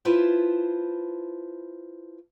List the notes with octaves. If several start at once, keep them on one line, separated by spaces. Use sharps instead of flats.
E4 F4 B4 C5 A5